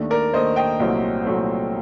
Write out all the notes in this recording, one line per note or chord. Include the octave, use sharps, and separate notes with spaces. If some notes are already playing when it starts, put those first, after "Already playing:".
Already playing: D#2 D#3 A3 D4
A#4 D5
D#2 D#3 A3 D4 C5 D#5
D#5 G5
C2 A#2 F#3 A3 C4
C2 A#2 F#3 A3 C4